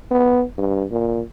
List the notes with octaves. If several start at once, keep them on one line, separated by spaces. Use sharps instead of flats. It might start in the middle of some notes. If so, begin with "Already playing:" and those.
B3
G2
A#2